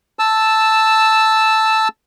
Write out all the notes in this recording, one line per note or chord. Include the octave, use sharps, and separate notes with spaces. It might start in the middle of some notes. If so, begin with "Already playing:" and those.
A5 E6